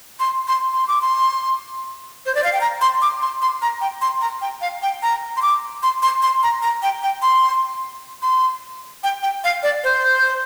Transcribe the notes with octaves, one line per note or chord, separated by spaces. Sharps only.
C6
C6
C6
D6
C6
C5
D5
F5
G5
A#5
C6
D6
C6
C6
A#5
G5
C6
A#5
G5
F5
G5
A#5
C6
D6
C6
C6
C6
A#5
A#5
G5
G5
C6
C6
G5
G5
F5
D5
C5